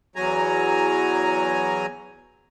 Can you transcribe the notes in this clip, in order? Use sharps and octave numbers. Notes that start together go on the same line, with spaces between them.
E2 F#3 G#5 A#5